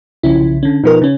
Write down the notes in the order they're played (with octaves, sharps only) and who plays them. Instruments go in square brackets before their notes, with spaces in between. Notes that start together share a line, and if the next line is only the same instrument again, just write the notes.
[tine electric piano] B1 C#3 [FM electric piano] F3 C#4 E4
[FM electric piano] D3 C#4
[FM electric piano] B2 F3 A#4 [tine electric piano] D#4 B4
[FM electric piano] C#3 C#4